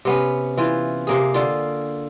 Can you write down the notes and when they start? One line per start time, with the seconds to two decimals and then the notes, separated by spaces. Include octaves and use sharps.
0.05 C3 B3 C#4
0.57 E3 F4
1.07 C3 A#3 G#4
1.34 D3 F4